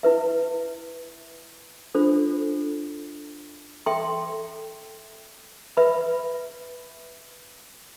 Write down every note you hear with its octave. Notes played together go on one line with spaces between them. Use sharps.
E4 B4 E5
D4 F4 A4 C5
A4 E5 G5 C6
B4 E5 B5